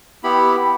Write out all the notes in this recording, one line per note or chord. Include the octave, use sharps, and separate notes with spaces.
B3 E4 G4 B5